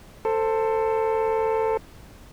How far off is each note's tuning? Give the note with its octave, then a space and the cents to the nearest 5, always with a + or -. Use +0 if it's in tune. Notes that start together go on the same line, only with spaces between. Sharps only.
A4 +15 C5 +0